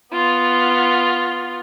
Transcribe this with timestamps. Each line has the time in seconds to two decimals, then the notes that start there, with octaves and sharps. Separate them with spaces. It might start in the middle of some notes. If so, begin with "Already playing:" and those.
0.13 B3 F4